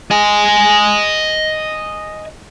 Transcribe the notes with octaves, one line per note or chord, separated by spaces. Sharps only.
D#5 G#5